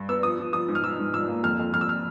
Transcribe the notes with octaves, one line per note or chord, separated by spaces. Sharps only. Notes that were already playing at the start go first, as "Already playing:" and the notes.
Already playing: G2
B3 E6
F3 D#6
F3
F3 D#6
G#2
F6
F3 E6
G#2
F3 E6
A#3
F2 F6
F2
F2 F6
E6
F6